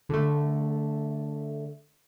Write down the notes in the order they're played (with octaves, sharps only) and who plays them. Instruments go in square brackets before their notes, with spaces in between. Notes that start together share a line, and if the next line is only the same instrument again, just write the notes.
[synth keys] D3 A3